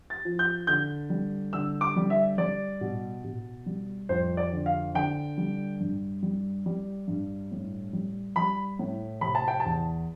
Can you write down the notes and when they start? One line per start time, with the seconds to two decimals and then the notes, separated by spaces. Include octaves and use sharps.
0.10 A6
0.25 F3
0.39 G6
0.67 D3 G6
1.10 G3
1.53 D3 E6
1.81 D6
1.96 G3
2.10 E5
2.38 G3 D5
2.81 B2
3.24 B2
3.66 G3
4.09 F2 C5
4.37 D5
4.52 D3
4.66 F5
4.94 D3 G5
5.38 G3
5.80 G2
6.23 G3
6.66 G3
7.08 G2
7.51 A2
7.93 G3
8.36 G3 B5
8.79 A2
9.21 C3 B5
9.35 A5
9.48 G5
9.60 A5
9.65 E2